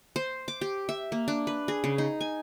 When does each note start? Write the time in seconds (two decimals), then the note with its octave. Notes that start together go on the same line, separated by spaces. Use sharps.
0.16 C5
0.48 D6
0.61 G4
0.89 E5
1.12 A#3
1.28 D4
1.47 B4
1.68 G#4
1.84 C#3
1.98 D#4
2.21 G#5